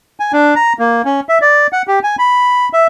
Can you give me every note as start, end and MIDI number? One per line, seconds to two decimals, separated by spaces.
0.20 0.32 80
0.33 0.54 62
0.56 0.73 82
0.79 1.02 58
1.05 1.20 61
1.29 1.38 76
1.41 1.67 74
1.73 1.82 78
1.88 1.99 67
2.03 2.16 80
2.19 2.69 83
2.73 2.87 76